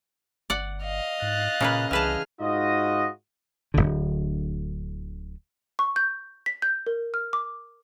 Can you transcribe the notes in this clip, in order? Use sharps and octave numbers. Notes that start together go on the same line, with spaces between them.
G1 D5 F#5
D#5 F5
G#2 F#6 A6
A#2 C#3 A#3 B4
C2 E3 G#4 B4 A5 F6
G#2 D#4 F4 F#4 D#5
D1 G#1 D2 D3
C#6
G6
B6
G6
A#4
F6
D6